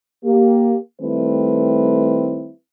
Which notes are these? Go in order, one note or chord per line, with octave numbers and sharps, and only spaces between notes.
A#3 G4
D#3 G3 A3 C4 E4 B4